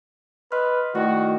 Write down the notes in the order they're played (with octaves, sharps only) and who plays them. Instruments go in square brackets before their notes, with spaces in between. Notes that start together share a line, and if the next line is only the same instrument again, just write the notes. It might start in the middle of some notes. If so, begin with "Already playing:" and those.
[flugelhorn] B4 [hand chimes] D#5 C6 F6
[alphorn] D#3 [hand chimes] A3 E4 D5 [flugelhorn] F#4